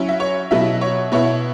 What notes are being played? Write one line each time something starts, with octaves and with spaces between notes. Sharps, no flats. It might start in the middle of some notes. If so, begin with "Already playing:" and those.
Already playing: F#3 C#4 E4
E5
C#5
B2 F#3 E4 E5
C#5
B2 B3 E4 C#5